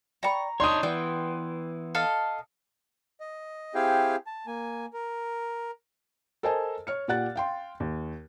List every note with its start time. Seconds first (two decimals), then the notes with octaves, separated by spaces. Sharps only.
0.23 D5 G5 A#5 B5 C#6
0.60 D4 D#4 C#5 D5 A5 C6 D#6
0.83 E3 B3 D5 G5
1.95 A4 D#5 F5
3.20 D#5
3.75 C4 E4 G4 G#4 F5 G5
4.27 A5
4.47 A#3 G#5
4.93 A#4
6.43 A4 A#4 C5 D#5 G#5 A5
6.87 C#5 F6 C#7
7.08 A#2 G4 D5 F#5 F#6 A6
7.36 F5 G5 C6
7.80 D#2